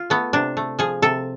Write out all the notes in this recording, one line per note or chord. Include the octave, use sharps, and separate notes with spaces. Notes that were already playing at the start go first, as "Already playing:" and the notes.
Already playing: F4
A3 B3
C3 D4
A3
F3 G#4
C3 A4